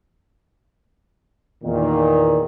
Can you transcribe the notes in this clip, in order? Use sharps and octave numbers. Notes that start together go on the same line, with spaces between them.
E2 A#2 D#3